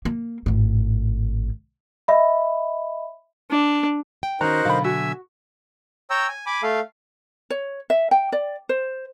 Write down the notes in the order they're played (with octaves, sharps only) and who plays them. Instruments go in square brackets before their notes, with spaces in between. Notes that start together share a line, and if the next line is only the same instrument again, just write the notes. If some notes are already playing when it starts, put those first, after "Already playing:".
[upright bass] A#3
G#1 A2
[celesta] D#5 E5 B5
[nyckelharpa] D4
[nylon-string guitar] G5
[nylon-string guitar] D#3 C#4 [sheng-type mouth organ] D#4 A#4 C5 [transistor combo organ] F#4 [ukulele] A#5
[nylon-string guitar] B2 D3 F#3 [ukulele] F5 B5
[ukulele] F#4 [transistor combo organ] E5 [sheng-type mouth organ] G#5
[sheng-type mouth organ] C#5 G5 A#5 E6
G#5
G#5 B5 D6
A3 A4 F5
[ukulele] C#5
E5
G5
D5
C5